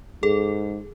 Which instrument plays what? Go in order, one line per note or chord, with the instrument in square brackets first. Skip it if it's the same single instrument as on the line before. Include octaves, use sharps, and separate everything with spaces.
[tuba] G#2 [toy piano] G#4 [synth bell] A4